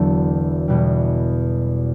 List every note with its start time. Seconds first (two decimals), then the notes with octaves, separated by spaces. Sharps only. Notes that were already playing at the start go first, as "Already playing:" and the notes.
Already playing: E1 E2 D3 F#3 A5
0.68 E2 B2 G3